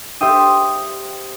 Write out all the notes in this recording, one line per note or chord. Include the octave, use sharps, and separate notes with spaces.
G4 C5 D5 E5 G5 D#6